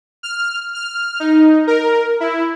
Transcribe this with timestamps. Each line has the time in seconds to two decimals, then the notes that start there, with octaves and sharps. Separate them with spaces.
0.23 F6
0.74 F6
1.20 D#4
1.67 A#4
2.20 E4